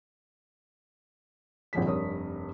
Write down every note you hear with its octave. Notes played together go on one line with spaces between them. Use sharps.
G#1 F2 A#2 F3 G#4 B6
F1 G2 A#4 C#5 D#6